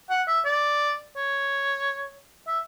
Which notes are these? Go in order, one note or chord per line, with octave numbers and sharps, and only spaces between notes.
F#5
E5
D5
C#5
E5